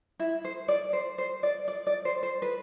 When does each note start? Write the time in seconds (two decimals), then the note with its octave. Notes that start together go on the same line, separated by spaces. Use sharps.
0.19 E4
0.45 C5
0.68 D5
0.93 C5
1.18 C5
1.43 D5
1.68 D5
1.87 D5
2.05 C5
2.23 C5
2.42 B4